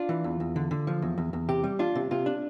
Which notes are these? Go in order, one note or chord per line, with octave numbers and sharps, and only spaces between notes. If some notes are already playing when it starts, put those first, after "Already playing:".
Already playing: D4 F4
E3
E2
E2
D3
D3
F3
E2
E2
E2
C3 G4
G3
D4 F4
C3
C3 F4
D4